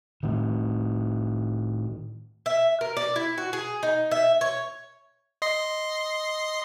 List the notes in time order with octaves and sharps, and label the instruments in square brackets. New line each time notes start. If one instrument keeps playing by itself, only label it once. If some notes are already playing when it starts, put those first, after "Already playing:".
[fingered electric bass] A2 D#3
[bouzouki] E5
A#4
D5
E4
F#4
G#4
D#4
E5
C#5
[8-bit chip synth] D#5 C6 C7